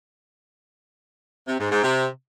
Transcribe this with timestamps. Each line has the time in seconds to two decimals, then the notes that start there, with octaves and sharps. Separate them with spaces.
1.48 C3
1.59 G#2
1.71 G#2
1.83 C3